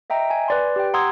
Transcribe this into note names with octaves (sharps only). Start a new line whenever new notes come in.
D#5 E5 G5 A#5
G#5
B4 D5 C6
G4 G5
F#5 A#5 C6 D#6 E6 G#6